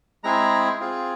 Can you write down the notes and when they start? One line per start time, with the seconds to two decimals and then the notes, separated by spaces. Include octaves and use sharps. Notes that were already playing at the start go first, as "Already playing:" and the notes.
0.24 G#3 C4 E4 G#4 A#5
0.80 C4 F4 G#4